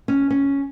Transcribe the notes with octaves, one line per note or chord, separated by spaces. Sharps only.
C#4
C#4